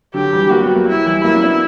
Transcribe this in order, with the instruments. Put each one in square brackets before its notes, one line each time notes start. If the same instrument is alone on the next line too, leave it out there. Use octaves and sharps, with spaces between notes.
[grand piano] D3 F#3 [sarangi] G4
[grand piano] E3 G3
[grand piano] F#3 A#3 [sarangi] F#4
[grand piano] G3 B3
F#3 A#3
[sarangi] E4
[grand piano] F#3
E3 G3
[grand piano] F#3 A#3 [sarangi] E4
[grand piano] C#4
B3 D4